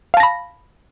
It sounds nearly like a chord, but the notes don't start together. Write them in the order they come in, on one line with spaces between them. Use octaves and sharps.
F5 A5 A#6 B5